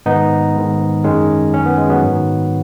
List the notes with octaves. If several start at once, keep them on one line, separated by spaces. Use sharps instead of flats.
G#2 D#3 B3 D#4
G#2 D#3
F#2 D#3 G#3 C#4
F#2 D#3 C#4
B3
G#3
F#3 B3
G#2 D#3